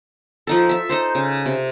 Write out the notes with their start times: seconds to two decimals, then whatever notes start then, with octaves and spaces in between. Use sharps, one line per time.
0.47 F3 D#4 A4
0.69 E5 A5
0.89 D#4 A4 C5
1.15 C#3
1.46 C3